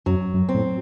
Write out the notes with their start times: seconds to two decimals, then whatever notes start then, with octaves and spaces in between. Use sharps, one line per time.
0.06 F#2 F#3
0.34 F#2
0.49 C4
0.55 A2